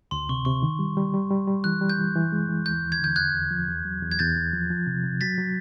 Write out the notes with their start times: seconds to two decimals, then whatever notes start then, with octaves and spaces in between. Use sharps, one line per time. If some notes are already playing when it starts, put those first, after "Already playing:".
0.11 D2 C6
0.29 C3 C#6
0.45 C3 C#6
0.63 D#3
0.79 G3
0.97 G3
1.14 G3
1.30 G3
1.48 G3
1.64 E3 F#6
1.81 G3
1.90 G6
1.98 E3
2.16 E3
2.32 G#3
2.49 E3
2.66 D#2 G6
2.83 D#2
2.92 G#6
3.00 D3 G6
3.16 E2 F#6 G#6
3.34 E2
3.51 F3
3.68 E2
3.85 F#3
4.02 E2
4.11 G#6
4.19 E2 G6 A6
4.36 E2
4.53 F3
4.70 F3
4.87 C3
5.04 C3
5.21 F#3 A6 B6
5.38 F#3